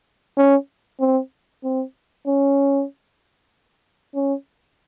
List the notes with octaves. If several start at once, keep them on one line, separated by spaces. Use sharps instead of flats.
C#4
C4
C4
C#4
C#4